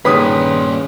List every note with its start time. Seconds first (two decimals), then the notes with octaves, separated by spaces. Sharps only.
0.05 G2 A#2 D#3 C#4 G#4 B4 D#6 B6